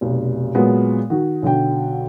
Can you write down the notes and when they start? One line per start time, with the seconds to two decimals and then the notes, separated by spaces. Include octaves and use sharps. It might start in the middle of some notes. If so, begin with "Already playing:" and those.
0.01 F1 B1
0.55 A#2 F#3 G#3 B3
1.10 D#3 F#4
1.42 B1 D3 F#4 G5